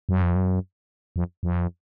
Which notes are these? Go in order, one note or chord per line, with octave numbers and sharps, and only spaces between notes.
F#2
F2
F#2
F2
F2